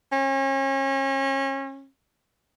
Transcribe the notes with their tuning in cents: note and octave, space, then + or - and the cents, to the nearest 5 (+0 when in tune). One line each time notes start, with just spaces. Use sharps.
C#4 -35